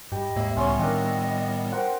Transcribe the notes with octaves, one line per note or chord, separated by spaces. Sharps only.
G2 G3 D#5
D#2 G#2 A#3 E5
C#2 A2 G3 B3 C#4 C#5 C6
D#3 C4 D4 A#4 D#5
A#4 C5 F#5 G5